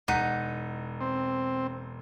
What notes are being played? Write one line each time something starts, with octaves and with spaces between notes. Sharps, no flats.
E1 D#4 F#5 B6 D#7
C4